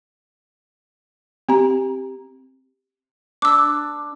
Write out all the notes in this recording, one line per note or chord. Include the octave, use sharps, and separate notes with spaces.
C4 G4 A#5
D4 D6 E6